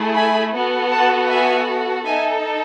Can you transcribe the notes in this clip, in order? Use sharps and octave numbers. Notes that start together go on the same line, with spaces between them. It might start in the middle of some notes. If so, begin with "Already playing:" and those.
Already playing: A3 E4 G#4
G#5 B5
B3 F#4 A4
F#5 A5
E5 G#5
D#4 A4 E5 G#5